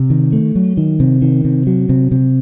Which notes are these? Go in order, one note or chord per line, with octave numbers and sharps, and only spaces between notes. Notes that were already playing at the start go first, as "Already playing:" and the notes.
Already playing: C3
D#3
A3
F#3
D#3
C3
D#3
C3
F#3
C3
C3